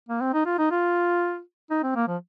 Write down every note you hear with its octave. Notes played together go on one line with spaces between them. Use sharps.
A#3
C4
D#4
F4
D#4
F4
D#4
C4
A#3
F3